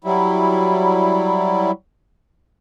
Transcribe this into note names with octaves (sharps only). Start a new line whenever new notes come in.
F#3 G3 E4